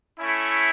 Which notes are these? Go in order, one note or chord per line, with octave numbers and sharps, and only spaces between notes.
A3 C#4 E4